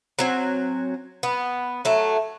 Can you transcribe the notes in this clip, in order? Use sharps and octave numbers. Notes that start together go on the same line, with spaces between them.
F#3 C4 G#5
B3
F#3 A3